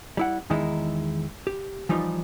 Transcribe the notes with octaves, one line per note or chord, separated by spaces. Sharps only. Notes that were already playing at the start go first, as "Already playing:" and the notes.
G3 E4 F#5
E2 D#3 G#3 D#4 E4
G4
E3 F3 G3 D#4 F4